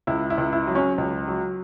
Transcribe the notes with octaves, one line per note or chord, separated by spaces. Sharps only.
C#2 E4
E4
C#2
E4
F#3
C#4
C#2
F#3